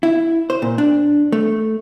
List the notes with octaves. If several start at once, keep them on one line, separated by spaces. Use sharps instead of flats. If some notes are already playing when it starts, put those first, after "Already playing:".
E4
C5
A#2
D4
A3